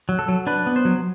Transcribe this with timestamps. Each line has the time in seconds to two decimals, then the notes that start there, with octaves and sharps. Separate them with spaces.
0.09 F#3
0.19 A4
0.28 F#3
0.47 D4 B4
0.67 B3
0.76 C5
0.85 F#3